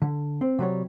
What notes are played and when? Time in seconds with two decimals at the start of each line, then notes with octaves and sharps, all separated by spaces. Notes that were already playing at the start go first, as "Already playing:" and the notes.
0.02 D3
0.41 C4
0.59 C3 F#3 G3 C#5